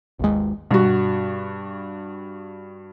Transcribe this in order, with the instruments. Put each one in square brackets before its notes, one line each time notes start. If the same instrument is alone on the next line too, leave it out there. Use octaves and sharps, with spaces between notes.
[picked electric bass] G#1 D#2 G#3
[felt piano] G2 F#4 [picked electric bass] B2